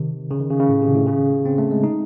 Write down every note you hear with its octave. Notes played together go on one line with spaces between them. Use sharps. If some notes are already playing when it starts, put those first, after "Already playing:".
Already playing: C3 D#3
C#3
D#3
C#3
C#3
A2
C3
A2
C#3
C4
A3
G#3
D#4